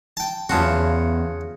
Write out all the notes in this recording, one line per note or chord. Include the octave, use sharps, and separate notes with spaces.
G5 A5
E2 C#3 F4 F#4 A5